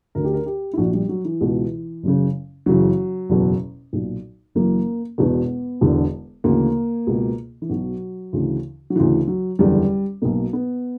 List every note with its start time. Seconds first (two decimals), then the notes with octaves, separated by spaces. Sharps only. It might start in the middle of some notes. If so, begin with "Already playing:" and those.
0.15 D2 D3 A#4
0.24 G4
0.34 A#4
0.46 G4
0.73 E4
0.77 A#1 A#2 F#4
0.94 G3
1.09 F#3
1.25 E3
1.41 C#2 B2
2.03 F#1 F#2 C#3
2.66 F#1 F#2 C#3 E3 F#3
3.30 F#1 E2 B2
3.93 B1 A#2
4.55 F#1 F#2 E3 A#3
5.18 E1 E2 B2 B3
5.81 E1 E2 D3
6.44 D2 C#3 E3 A#3
7.07 C#2 B2
7.62 E3
7.69 B1 B2 F#3
8.33 D2 C#3 E3
8.90 F#3
8.96 D2 C#3 E3
9.27 F#3
9.59 F#1 E2 D3 G3
10.22 B1 B2 A#3
10.53 B3